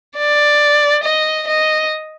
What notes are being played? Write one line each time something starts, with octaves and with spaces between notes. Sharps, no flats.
D5
D#5
D#5